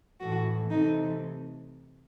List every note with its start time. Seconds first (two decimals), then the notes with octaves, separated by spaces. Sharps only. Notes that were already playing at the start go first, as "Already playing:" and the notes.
0.20 A2 E3 A3 F#4
0.70 C3 E3 A3 D#4